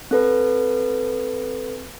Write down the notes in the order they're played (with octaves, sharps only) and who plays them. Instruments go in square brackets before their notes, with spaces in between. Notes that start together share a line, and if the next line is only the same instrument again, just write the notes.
[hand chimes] C4 A4 B4